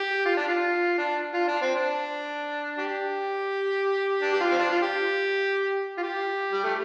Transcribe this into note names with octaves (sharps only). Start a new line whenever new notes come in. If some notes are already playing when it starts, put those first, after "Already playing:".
Already playing: G4
F4
D4
F4
D4
F4
D4
C4
D4
D4 G4
D4
G4
F4
C4
D4
F4
G4
F4
G4
G3
A3